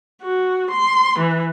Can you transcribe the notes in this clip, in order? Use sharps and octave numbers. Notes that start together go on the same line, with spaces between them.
F#4
C6
E3